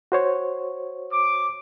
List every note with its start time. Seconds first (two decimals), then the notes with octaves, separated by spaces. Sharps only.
0.12 F#4 C5 C#5
1.13 D6